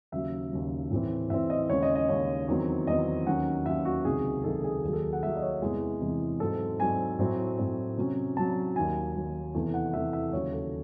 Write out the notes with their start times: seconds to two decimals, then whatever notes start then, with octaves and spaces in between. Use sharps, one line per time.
0.12 D#2 C#3 F#3 E5
0.52 D#2 C#3 F#3
0.91 A2 E3 C4
1.30 A2 E3 C4 E5
1.50 D#5
1.70 D#2 C#3 G#3 C#4 C#5
1.83 D#5
1.95 D#5
2.09 D#2 C#3 G#3 C#4 C#5
2.48 E2 D#3 F#3 C4
2.87 E2 D#3 F#3 C4 D#5
3.26 D#2 D#3 F#3 C#4 F#5
3.66 D#2 D#3 F#3 C#4 E5
3.85 F#4
4.04 C#2 C3 D#3 F#3 G#4
4.44 C#2 C3 D#3 F#3 A4
4.64 G#4
4.84 D#2 D#3 F#3 G#4
4.93 A4
5.13 F#5
5.23 D#2 D#3 F#3 E5
5.37 D#5
5.42 C#5
5.62 E2 C3 E3 G#3 G#4
6.01 E2 C3 E3 G#3
6.40 G#2 F#3 C4 A4
6.79 G#2 F#3 C4 G#5
7.19 A2 F#3 C4
7.59 A2 F#3 C4
7.98 C3 F#3 C#4
8.37 C3 F#3 C#4 A5
8.76 D#2 D#3 F#3 G#5
9.15 D#2 D#3 F#3
9.55 E2 C3 E3 A3
9.74 F#5
9.94 E2 C3 E3 A3 E5
10.13 E5
10.33 D#2 C#3 F#3 C#5
10.52 A4